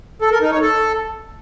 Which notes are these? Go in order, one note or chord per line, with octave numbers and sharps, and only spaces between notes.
A4
A#4
D#4
C#5
A4